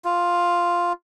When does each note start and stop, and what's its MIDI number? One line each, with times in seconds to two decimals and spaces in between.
0.05 0.93 65